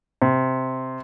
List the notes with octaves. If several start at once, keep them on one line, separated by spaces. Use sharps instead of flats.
C3